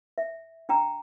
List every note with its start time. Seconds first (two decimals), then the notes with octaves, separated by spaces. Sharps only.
0.18 E5
0.69 D4 G5 A#5